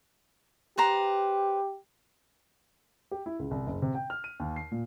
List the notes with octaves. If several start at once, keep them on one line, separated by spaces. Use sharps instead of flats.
G4 B4 C5 A#5
G4
E4
C#2
C2
F#1
C3
G5
F6
D#7
D#2
C7
A#2